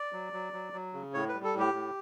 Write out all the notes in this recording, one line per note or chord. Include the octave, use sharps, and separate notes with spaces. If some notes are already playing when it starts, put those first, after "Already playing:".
Already playing: D5
F#3
F#3
F#3
F#3
C#3
A2 C#5
B4
G3
A4
A2
G4
A2